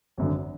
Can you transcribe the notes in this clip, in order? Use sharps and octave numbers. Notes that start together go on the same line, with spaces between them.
G#1 F#2 D3